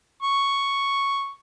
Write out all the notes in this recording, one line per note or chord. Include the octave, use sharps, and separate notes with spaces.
C#6